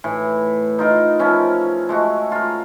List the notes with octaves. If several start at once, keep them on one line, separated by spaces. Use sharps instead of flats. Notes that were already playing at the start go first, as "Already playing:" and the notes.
A2 E3
D#4 F4 A#4
F3 C#4 E4
G#3 A3 F#4
F4 A#4